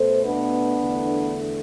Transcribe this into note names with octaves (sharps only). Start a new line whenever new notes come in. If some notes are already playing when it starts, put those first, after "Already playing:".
Already playing: B2 A3 A4 C5
B3 D4
E2 D3 A3